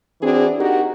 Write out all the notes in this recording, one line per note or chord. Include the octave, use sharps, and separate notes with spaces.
E3 C4 D4 F#4 G#4
D#4 F#4 G4 A#4